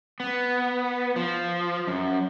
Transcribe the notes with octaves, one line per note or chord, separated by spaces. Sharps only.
B3
F3
F#2